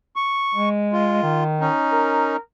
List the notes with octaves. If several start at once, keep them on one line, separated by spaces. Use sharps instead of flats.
C#6
G#3
F4
D#3
C#4 D#4
A#4